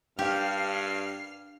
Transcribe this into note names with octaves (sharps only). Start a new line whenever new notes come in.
G2 D4 G4 F5 F6 C7